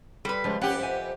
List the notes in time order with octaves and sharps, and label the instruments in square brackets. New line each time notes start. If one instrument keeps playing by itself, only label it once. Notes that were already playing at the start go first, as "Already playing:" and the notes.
[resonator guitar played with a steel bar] G3 B4 [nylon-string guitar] A4
[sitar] C#3 [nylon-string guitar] F3 G#3
[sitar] F2 G4 [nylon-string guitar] B3 C#4 [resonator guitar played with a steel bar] F#5
[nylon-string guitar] C5 E5 G#5